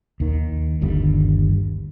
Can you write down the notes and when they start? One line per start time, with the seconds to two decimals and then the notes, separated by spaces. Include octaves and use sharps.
0.20 D#2 D#3
0.81 G1 D#2 D3 G3